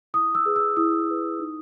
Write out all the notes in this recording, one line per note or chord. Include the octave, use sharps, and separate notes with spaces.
E4 D#6
E6
G#4 B4
E6
E4 D#6
G#4 B4
D#4